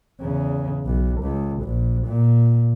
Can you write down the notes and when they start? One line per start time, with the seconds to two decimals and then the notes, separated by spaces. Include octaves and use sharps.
0.21 E2 C#3
0.85 B1
1.22 C#2
1.64 A#1
2.07 A#2